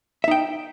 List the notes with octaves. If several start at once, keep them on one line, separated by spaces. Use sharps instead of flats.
D#4 E5 G5